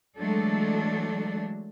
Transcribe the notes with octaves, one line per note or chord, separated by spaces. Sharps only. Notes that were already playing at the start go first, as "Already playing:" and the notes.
E3 F#3 G#3 A3 D4 A4